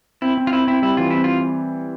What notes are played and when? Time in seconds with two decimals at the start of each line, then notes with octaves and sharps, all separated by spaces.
0.22 C4 E4
0.37 C4
0.47 F4
0.53 C4 E4
0.67 C4 E4
0.82 G3 E4
0.97 E3 F4
1.11 C4 E4
1.24 F4